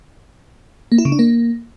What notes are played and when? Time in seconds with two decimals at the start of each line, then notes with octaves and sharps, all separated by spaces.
0.92 A#3
0.98 E4
1.05 C#3
1.12 D4
1.19 A#3